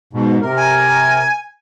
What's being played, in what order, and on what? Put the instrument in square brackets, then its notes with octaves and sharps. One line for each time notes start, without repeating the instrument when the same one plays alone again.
[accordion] G#2 B2
C3 A#4
[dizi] G#5